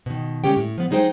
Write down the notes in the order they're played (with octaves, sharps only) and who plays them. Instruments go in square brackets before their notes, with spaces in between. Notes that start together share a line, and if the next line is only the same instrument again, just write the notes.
[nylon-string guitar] B2 D#3
D3 G#3 C#4 G4 G5
A2
F3 B3
F#3 G#3 D#4 G#4 C5 G5